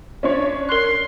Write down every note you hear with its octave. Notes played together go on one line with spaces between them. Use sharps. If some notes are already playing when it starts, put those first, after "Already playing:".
C#4 D4 C#5
A#4 C6 F#6